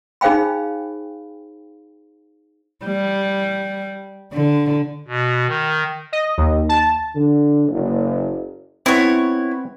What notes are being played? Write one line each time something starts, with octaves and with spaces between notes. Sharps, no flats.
D#4 G#4 C5 F5 G5 B5
G3
D3
B2
D#3
D#5
D#2
A5
D3
F#1
B3 C4 E4 C#5